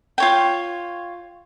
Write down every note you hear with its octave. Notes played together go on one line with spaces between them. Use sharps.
F4 C#5 G5